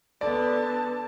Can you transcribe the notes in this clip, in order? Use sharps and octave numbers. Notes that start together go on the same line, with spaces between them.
D3 B3 D5 A5